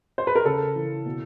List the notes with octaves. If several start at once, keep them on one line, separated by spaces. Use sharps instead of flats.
C5
B4
A#4
C#3 A4
E3
B2